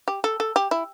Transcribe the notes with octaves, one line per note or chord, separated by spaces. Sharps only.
G4
A4
A4
G4
E4